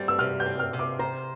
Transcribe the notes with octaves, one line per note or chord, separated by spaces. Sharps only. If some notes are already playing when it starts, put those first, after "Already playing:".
Already playing: G3 C4 A6
E6
C3 F6
G6
C4
F6
C3
D6
C5 A#5